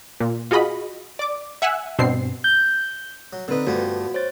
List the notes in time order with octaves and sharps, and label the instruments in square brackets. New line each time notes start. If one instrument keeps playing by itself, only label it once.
[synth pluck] A#2
F4 F#4 G#4 D#5 B5
D5 D6
E5 F#5 G#5 E6 F#6
G2 B2 C4 C7
G6
[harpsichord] F#3
[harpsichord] D3 D#4 [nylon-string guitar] C4 B4
[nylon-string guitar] G2 G3 A3 [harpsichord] F3 B3 [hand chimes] F#4
[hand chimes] C5 C#5 A6